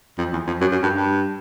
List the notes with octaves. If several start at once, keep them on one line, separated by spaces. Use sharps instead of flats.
F2
E2
F2
F#2
F#2
G2
G2